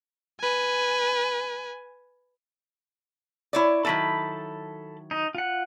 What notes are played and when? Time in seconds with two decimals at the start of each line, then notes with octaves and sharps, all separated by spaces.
0.41 B4 G#5
3.53 E4 C#5 D5
3.85 D#3 F#3 E4 A4 A5 B5
5.11 D#4
5.35 F4 F#5